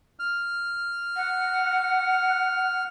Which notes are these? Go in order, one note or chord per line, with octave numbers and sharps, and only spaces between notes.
F6
F#5